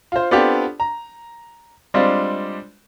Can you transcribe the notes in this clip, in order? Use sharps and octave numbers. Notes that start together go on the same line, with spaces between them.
F4 C5
B3 C4 D4 F4 G4 A4
A#5
G3 G#3 C4 D4 F4